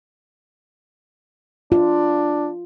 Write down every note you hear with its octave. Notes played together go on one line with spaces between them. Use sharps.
D4 F4